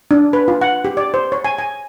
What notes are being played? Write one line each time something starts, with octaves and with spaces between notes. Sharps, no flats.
D4
B4
F4
F#5
G4
D5
C5
C#5
G#5
G#5